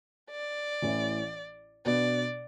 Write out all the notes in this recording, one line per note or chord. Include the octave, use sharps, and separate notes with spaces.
D5
A1 A2 E3
B2 B3 D4 D5